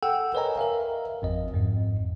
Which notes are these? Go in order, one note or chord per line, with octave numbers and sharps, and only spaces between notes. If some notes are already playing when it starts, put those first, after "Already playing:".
A4 F#5 G5 E6
A#4 B4 C#5 D#5 G#5 A#5
A#4 E5 F5
G#1 F2 D#5
F2 G#2